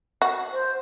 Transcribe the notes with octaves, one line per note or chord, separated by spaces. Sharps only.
F#4
C5